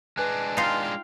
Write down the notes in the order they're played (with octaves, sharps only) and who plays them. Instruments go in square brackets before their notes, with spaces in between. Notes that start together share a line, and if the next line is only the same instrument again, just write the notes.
[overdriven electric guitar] G#3 D4 [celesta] B4 G#5 F#6
[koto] D#4 F4 [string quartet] F5 G5 C6